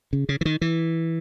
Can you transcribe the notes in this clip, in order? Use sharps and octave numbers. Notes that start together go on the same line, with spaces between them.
C#3
C#3
E3
D#3
E3